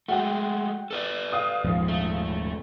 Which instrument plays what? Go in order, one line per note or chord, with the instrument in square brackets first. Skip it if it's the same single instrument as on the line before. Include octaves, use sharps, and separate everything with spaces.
[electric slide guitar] G#3 A3 [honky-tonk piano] F#4 G5
[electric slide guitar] A4 B4 D5
[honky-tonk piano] F5 D#6
[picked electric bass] D#1 G#2 F3
[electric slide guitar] A3